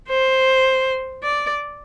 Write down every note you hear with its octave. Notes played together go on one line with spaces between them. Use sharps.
C5
D5